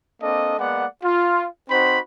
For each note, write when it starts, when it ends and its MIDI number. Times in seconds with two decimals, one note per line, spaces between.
0.22 0.56 58
0.22 0.56 60
0.22 0.56 62
0.22 0.56 69
0.22 0.56 75
0.58 0.86 56
0.58 0.86 58
0.58 0.86 59
0.58 0.86 74
0.58 0.86 78
1.04 1.46 65
1.70 1.98 60
1.70 1.98 63
1.70 1.98 66
1.70 1.98 72
1.70 1.98 83